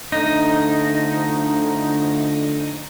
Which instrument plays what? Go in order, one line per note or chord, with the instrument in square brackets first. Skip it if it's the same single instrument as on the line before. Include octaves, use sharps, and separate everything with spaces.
[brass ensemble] D3 F3 A3 [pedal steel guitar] D#4